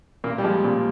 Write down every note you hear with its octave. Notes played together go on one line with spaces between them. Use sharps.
A#2 A#3
G3
F3 G#3
A#2